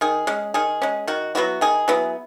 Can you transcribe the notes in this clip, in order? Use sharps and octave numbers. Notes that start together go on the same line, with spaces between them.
D#3 G#4
G#3 C#4
D#3 G#4
G#3 C#4
D#3 F#4
F#3 B3 E4 F#4
D#3 G#4
F#3 B3 E4